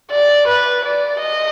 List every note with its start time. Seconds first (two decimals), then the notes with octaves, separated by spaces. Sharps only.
0.11 D5
0.47 B4
0.84 D5
1.20 D#5